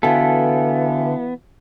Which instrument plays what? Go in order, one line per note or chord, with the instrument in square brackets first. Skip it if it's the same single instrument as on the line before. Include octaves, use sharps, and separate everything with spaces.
[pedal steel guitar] D3 A4 [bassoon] E3 [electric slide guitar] B3 [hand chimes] F#4 F5 G#5